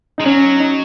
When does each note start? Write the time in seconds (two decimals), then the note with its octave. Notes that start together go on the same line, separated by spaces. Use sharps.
0.18 G#3 D#4
0.25 F#3 C#4
0.60 D#4